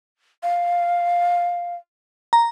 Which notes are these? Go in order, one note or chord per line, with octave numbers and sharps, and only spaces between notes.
F5
A#5